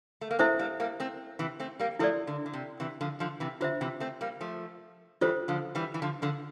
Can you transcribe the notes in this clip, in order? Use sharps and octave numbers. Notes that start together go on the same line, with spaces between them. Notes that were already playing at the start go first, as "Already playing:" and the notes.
A3
A#3
A3 C4 E4 A4 C5 E5
G3 A#3
G3 A#3
A3 C4
C3 E3
A3 C4
G3 A#3
F3 A3 E4 A4 D5
D3
D3
C3
C3 E3
D3 F3
D3 F3
C3 E3
D3 F4 C5 E5
C3 E3
A3 C4
G3 A#3
F3 A3
E3 G3 F4 A4 C5
D3 F3
E3 G3
E3
D3 F3
D3 F3